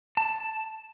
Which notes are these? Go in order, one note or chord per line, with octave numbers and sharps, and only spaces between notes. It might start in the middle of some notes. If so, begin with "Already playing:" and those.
A5